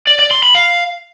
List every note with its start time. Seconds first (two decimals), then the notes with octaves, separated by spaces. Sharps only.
0.07 D5
0.19 D5
0.31 C6
0.43 B5
0.55 F5